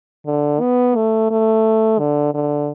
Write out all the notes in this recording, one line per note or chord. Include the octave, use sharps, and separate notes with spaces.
D3
B3
A3
A3
D3
D3